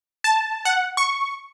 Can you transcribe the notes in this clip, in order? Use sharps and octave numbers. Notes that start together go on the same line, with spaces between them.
A5
F#5
C#6